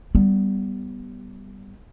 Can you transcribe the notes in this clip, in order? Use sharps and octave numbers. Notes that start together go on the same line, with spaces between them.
G3 B3